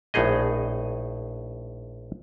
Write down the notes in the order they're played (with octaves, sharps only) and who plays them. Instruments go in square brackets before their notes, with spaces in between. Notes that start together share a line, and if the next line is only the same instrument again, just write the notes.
[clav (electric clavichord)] A#1 A2 D#4 G#4 D#5